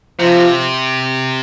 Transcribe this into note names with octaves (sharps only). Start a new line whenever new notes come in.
C3 F3